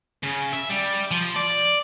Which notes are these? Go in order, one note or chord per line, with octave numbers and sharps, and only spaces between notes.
C#3
E5
G3
F3
D5